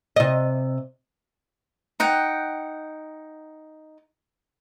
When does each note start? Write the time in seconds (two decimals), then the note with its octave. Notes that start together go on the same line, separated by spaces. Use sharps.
0.16 C3 D#5
2.00 D#4 F#5 G5